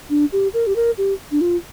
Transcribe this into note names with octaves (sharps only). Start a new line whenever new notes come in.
D4
G4
A#4
G4
A#4
G4
D4
F4